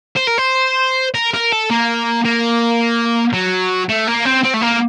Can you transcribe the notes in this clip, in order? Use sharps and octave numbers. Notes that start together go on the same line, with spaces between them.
C5
A#4
C5
A#4
A#4
A4
A#3
A#3
F#3
A3
A#3
C4
C4
A3
A#3